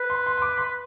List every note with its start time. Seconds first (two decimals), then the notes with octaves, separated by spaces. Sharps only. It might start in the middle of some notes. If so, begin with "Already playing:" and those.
Already playing: B4
0.10 C6
0.27 C6
0.38 C6
0.42 D6
0.58 C6